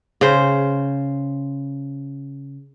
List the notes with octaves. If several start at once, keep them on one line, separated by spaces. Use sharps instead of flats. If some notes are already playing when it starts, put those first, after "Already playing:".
C#3 C5